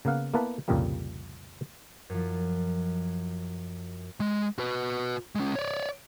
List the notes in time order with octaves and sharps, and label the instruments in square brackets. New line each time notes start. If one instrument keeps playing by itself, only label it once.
[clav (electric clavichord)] C#3 A#3 B3 F5 F#5
A#3 B3 E4 A4 B4
C2 F2 A#2 C#3 G3 A#3
[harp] F#2 F3
[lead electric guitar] G#3
F#4 B4
G#3 C#4
C#5 D5